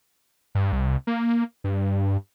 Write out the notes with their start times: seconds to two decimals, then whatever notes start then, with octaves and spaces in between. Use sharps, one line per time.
0.55 G2
0.72 C2
1.07 A#3
1.64 G2